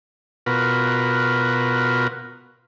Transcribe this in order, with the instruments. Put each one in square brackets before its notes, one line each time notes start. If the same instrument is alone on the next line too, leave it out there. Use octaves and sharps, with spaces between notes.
[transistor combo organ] B2 F4 F#4 A#4 B4